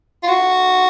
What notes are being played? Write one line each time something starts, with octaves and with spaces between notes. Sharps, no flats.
F4
F#4